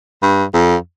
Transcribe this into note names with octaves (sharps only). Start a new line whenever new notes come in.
G2
F2